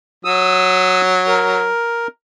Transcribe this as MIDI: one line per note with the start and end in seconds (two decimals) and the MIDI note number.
0.25 1.66 54
0.25 1.01 87
0.25 1.01 88
1.27 2.07 70